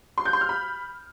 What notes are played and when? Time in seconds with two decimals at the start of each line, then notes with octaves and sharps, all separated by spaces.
0.18 C6
0.25 G6
0.33 C6
0.41 F6
0.49 B5